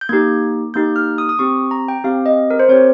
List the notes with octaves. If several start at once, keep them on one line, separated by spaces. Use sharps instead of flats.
G6
A#3 D#4 G4 G#6
A#3 D#4 G4 G6
F6
D#6
D#6
C4 G4 C#6
A#5
G5
C4 G4 F5
D#5
A#4
C5
C4 G4 C#5